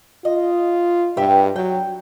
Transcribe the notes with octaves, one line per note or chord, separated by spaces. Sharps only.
F4 D#5
G2 G4 B4 E5
F#3 G5